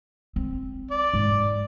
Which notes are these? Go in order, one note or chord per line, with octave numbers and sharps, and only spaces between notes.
C4
D5
G#2